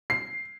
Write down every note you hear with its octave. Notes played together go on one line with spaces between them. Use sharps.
C7